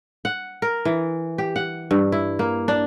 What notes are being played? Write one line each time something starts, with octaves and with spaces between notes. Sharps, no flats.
F#5
A#4
E3
G4
F#5
G2
E4
A#3
D4